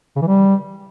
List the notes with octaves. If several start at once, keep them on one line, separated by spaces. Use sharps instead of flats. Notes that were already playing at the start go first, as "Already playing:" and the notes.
C#3
E3
G3